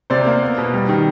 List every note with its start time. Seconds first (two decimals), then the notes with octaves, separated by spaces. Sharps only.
0.10 C3 C5 D5
0.26 A#3
0.42 B3
0.58 B2
0.74 G3
0.89 D#3